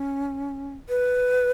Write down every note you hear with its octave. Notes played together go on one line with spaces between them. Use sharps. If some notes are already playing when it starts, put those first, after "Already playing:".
Already playing: C#4
B4